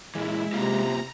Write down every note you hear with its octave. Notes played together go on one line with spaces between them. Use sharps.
A#2 E3 G#3 E4
C3 A#3 F4 G4 A#5